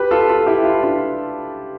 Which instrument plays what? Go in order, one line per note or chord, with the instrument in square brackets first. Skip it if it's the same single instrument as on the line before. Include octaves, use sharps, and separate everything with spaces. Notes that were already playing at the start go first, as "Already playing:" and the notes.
Already playing: [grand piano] G4 B4
F4 A4
F4 A4
E4 G4
F4
E4
D4 F4